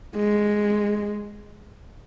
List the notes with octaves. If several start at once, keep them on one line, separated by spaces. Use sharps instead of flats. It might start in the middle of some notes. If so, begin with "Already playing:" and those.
G#3